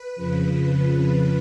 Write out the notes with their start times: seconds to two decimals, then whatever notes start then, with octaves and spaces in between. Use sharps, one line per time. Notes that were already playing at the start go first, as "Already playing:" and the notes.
Already playing: B4
0.16 F2 C#3 F3